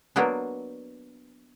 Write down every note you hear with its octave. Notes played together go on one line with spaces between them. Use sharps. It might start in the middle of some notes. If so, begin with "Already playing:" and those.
F#3 A#3 B3 D4